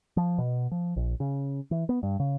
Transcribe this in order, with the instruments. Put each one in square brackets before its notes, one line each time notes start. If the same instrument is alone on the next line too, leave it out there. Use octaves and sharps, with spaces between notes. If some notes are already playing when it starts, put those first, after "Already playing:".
[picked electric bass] F3
B2
F3
A#1
C#3
E3
B3
G2
C#3